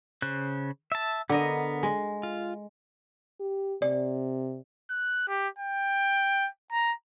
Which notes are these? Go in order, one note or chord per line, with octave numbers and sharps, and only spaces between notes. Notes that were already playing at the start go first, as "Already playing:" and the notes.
C#3 C5 F#6
E5 A5
D3 B3 A#4 D#5
G#3
F4
G4
C3 D5
F#6
G4
G5
A#5